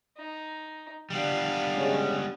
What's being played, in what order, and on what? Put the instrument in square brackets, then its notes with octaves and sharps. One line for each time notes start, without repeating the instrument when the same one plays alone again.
[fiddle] D#4
[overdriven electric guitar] G3 B3 [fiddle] D4 F5
[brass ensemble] G#3 C#4